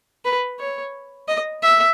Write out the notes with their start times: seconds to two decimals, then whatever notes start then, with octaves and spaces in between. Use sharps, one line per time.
0.25 B4
0.59 C#5
1.28 D#5
1.62 E5